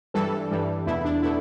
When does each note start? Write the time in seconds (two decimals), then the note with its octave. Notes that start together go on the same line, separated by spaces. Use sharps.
0.14 G2 E3 G3 A4
0.51 G2 E3 G3
0.86 E2 B2 A3 E4
1.05 D4
1.23 B2 A3 E4